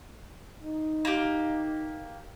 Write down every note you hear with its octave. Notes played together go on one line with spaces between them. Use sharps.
D#4
A#3 G4